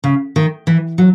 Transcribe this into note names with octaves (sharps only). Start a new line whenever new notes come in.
C#3
D#3
E3
F#3